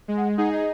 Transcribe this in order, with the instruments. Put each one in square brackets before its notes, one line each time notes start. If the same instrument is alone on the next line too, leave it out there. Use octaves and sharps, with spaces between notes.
[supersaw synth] G#3
[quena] F#5
[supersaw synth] D#4 G#4 [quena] F#5
[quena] D#5